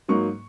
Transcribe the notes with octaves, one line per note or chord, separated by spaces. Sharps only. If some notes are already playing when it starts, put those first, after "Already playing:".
G#2 F#3 A#3 D#4 C#6